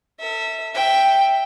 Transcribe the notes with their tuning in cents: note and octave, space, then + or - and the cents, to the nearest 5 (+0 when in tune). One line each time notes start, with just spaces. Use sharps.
A4 +35 E5 -20
E5 +0 G5 +0